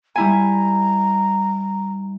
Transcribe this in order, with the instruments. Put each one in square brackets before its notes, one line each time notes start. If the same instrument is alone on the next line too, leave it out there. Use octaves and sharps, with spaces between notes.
[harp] G3 E4 G#5 [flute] A#5